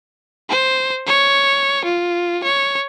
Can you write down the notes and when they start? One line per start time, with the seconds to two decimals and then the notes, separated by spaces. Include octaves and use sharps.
0.50 C5
1.07 C#5
1.85 F4
2.44 C#5